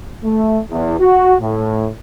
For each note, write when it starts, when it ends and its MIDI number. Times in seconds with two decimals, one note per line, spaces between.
0.24 0.59 57
0.71 0.97 40
1.00 1.36 66
1.41 1.89 45